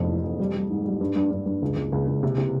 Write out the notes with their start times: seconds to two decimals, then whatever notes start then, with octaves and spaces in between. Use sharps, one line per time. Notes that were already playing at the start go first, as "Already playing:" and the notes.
Already playing: F1 F2 G#2
0.08 E3
0.24 F2
0.40 G3
0.55 G3
0.70 G#2
0.85 G3
1.01 G2
1.16 G2
1.31 G2
1.46 G2
1.62 C#2
1.76 C#2
1.92 C#2
2.08 C#2
2.23 C3
2.38 C3